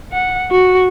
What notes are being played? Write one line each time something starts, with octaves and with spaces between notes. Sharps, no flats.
F#5
F#4